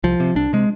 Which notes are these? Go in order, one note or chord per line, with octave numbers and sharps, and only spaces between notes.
C2 F3
C3
C2 D4
C3 G#3